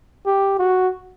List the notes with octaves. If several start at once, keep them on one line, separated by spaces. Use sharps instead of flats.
G4
F#4